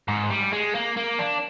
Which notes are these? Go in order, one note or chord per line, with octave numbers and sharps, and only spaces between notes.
G#2
G3
G#3
A#3
A#3
D4